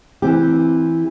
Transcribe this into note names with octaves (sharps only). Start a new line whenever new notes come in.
E3 C4 G4